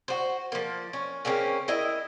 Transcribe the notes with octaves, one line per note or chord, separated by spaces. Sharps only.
F#4 C5
F3 A#3
C#4
C#3 A#3 C4 C#4
E4 A#4 D#5 E5